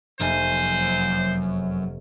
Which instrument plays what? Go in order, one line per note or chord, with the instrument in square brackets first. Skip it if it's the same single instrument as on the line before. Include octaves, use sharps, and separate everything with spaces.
[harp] F1 A#3 [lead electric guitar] F#2 G#5 [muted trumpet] C5